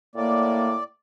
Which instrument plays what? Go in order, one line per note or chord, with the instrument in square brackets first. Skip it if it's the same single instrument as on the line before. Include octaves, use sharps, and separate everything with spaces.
[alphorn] A2 [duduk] A#3 [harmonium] D5